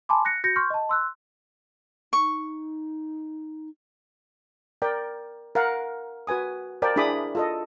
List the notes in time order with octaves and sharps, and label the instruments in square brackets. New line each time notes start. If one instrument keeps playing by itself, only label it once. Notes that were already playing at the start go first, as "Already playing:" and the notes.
[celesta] G#5 A5 B5 C6 D6
F#6 A#6 C#7
F#4 G6 A#6 C#7
C6 C#6 F6 G6
D#5 A5
C6 E6 F#6
[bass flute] D#4 [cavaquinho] C#6
[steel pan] A#4 D5 G5
A#4 F5 F#5
F#4 B4 G#5 D#6
A#4 C5 D5 F5 G5 A5
D4 E4 G#4 B5 D6 D#6
F4 A4 D#5